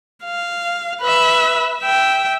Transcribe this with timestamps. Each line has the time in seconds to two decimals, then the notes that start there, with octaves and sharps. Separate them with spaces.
0.24 F5
1.02 B4 E5
1.81 E5 G5